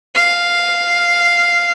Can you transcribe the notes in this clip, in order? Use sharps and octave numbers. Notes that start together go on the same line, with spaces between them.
F5